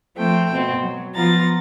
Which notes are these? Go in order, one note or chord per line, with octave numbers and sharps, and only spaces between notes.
F3 A3 C4 G5
B2 C4
F#3
F3 B3 F4 A#5 A6